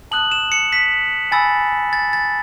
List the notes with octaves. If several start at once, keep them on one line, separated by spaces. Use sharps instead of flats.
A5 D#6 F#6 F#7
E7
C#7
B6
G#5 B5 E6 A6
A6
A6